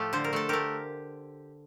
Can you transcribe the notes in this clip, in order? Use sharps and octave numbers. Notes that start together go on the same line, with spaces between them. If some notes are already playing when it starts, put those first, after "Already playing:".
Already playing: A2 F3 A3 F4 G4
D3 C5
A#4
A3 A4
A3 G4 A#4